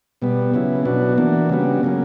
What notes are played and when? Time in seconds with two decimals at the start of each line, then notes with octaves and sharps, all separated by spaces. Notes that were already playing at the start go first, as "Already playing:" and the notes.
0.22 B2 G3 B3
0.54 C#3 F#3 B3 E4
0.85 B2 F#3 B3 D4 F#4
1.18 E3 A#3 D4 F#4
1.50 C#3 G3 B3 F#4
1.83 C#3 F#3 A#3